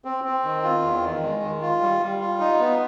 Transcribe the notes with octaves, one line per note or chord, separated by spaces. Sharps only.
C4
C4
D#3
F4
E2
D#3
G#3
D#3
F4
G3
G3
F4
D#4
B3